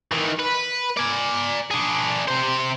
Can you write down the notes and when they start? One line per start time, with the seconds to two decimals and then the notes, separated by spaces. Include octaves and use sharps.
0.12 D#3 E3
0.39 B4
0.97 D5 G#5
1.71 D4 G#4
2.28 C3 C5